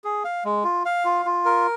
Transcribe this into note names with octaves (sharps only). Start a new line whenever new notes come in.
G#4
F5
G#3
F4
F5
F4
F4
A#4